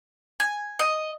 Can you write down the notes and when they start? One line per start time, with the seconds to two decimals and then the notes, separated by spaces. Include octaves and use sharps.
0.40 G#5
0.79 D#5